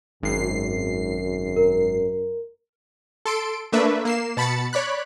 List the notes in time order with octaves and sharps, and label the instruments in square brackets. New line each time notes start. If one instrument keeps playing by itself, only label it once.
[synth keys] G#1 C7 [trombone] F#2
[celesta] A#4
[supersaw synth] A4 C6 D7
A3 A#3 D4 B4 E5
A#3 C7 E7
B2 A5 B5 A6 C#7
C#5 D5 B5 F#6